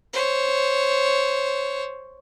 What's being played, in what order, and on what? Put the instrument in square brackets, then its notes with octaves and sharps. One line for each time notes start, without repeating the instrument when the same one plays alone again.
[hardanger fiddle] C5 C#5